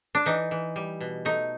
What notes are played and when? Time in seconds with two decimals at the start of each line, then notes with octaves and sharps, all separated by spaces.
0.15 D4
0.26 E3 D#4
0.51 E3
0.76 G3
1.01 B2
1.25 A3 D#4